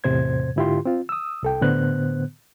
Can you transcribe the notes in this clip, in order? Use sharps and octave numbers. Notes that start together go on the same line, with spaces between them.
E2 A2 C3 C5 G#6
G#2 D3 E4 F4 G4 C6
C4 F4
D#6 E6
C2 A4 G5
A2 D3 B3 C5 F#6